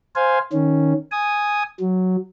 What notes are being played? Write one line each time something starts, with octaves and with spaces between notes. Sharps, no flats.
C5 F5 G#5
D#3 C#4
G#5 D#6
F#3